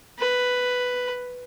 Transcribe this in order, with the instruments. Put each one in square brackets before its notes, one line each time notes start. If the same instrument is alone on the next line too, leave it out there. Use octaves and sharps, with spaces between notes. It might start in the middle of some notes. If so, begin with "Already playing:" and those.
[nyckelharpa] B4